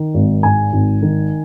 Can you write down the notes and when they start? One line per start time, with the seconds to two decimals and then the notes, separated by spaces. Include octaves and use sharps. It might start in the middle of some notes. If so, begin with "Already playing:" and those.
Already playing: D#3
0.14 G#1
0.43 G#2 G#5
0.72 G#1
1.02 D#3